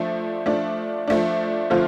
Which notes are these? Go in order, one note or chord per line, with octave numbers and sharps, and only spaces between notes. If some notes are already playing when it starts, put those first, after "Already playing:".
Already playing: F3 A3 D4
F3 A3 D4
F3 A3 D4
D3 F3 A3 C4 F4